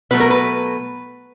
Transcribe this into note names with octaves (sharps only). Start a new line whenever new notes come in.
B2 F#3 A3 B4
A#4
B4